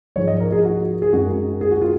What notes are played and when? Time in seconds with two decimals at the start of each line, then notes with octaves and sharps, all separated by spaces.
0.16 G#2 F3 G#3 C#5
0.28 D#5
0.40 A#4
0.52 G#4
0.65 F#4
1.02 G#4
1.13 F#2 D#3 G#3 F#4
1.61 G#4
1.71 F#4
1.82 F4